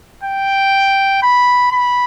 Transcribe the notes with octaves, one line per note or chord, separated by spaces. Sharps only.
G5
B5
B5